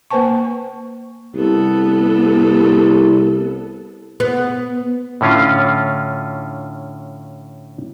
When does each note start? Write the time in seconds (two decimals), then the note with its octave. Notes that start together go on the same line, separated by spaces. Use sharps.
0.10 A#3 B4 C5 G#5 A5 C#6
1.35 C2 B3 A4
4.20 B3
5.21 A2 D3 C#4 F4